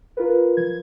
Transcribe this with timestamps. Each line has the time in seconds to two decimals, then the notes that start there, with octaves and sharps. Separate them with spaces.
0.17 F4 A#4 B4
0.57 F3 G#6